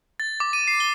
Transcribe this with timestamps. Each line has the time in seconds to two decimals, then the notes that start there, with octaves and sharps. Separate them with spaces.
0.20 A6
0.40 D6
0.53 D#7
0.67 C7
0.80 G7